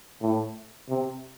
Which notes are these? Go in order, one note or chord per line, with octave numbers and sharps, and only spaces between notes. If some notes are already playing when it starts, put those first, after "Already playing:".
A2
C3